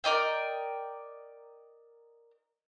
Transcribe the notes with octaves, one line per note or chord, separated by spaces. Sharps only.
A#4 D5 D#5 G5